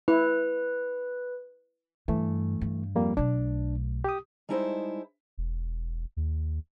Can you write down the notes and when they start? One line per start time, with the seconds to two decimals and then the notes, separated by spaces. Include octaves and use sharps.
0.08 E4 B4
2.08 G2 E3 A3
2.61 G2
2.95 F2 G3 A#3
3.17 B1 A3 D4
4.04 G4 D#6
4.49 G3 G#3 D#4 E4 A4 C5
5.38 E1
6.17 D#2